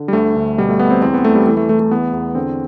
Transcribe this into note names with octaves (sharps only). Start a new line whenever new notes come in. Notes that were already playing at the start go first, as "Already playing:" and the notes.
Already playing: D3
G3
D2 A3
D2
B2 G3
A3
B2 B3
C4
E2 C4
B3
E2 A3
G3
E3 A3
A3
E3 A3
A3
E2 B3
E2
D3 C4